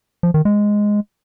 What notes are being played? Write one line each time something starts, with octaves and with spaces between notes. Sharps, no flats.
F3
D#3
G#3